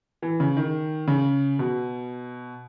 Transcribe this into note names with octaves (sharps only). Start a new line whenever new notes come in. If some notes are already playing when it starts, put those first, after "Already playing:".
E3
C#3
D#3
C#3
B2